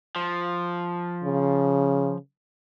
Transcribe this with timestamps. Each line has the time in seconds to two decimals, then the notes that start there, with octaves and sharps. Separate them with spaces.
0.16 F3
1.23 C#3